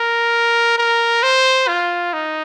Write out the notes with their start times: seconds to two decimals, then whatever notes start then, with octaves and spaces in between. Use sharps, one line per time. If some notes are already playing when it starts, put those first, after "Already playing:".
Already playing: A#4
0.78 A#4
1.23 C5
1.68 F4
2.13 D#4